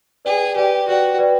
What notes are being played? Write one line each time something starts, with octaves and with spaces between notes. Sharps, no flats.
G#4 B4 D5 G5
G4 B4 D5 G5
F#4 B4 D5 G5
B4 D5 G5